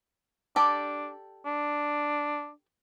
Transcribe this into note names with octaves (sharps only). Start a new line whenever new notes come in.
D4 G4 A4 D5
D4